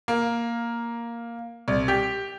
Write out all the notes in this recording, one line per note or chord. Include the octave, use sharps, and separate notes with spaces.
A#3
C2
G4